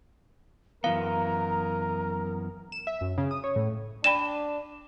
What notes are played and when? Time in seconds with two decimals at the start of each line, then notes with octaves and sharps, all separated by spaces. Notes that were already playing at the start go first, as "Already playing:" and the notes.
0.84 F#2 E3 B3 A#4 F5 A#5
2.72 E7
2.87 E5
3.01 F#2
3.18 C#3
3.31 D#6
3.44 C#5
3.56 A2
4.04 D4 D5 G5 B5 E7